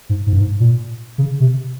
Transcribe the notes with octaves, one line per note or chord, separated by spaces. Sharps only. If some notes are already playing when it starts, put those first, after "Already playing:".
G#2
G#2
G2
G#2
A#2
C#3
C3